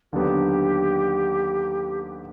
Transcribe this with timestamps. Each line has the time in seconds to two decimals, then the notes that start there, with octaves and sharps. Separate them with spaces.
0.12 D#2 D3 F#3 B3 D4 G4